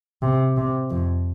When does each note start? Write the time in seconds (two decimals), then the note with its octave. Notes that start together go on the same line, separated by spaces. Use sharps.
0.22 C3
0.57 C3
0.90 F2